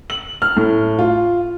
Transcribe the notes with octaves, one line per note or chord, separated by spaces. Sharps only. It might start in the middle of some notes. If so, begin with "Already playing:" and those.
F#7
F6
A2
F4